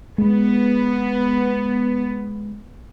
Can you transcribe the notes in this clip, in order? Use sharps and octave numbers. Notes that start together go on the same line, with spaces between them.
G#3 B3